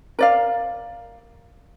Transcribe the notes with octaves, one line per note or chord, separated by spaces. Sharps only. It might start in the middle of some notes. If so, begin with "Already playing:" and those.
A#4 D5 F5